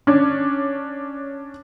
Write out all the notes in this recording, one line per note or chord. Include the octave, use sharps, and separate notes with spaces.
C#4 D4